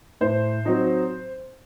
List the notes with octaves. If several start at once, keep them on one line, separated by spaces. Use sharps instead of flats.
A2 C5
F#3 C4 D#4